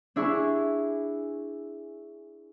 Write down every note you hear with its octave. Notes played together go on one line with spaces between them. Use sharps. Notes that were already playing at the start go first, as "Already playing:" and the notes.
D4 E4 G#4 C#6